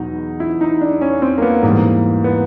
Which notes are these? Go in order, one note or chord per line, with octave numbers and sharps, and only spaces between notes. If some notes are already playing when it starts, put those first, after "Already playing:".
Already playing: E2 B2 F#3 D#4
E4
D#4
D4
C#4
C4
A#3
B3
G#2 E3 G3 A#3
B3